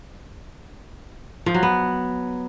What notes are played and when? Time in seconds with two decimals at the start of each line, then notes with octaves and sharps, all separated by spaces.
1.46 F3
1.54 F#3
1.63 B3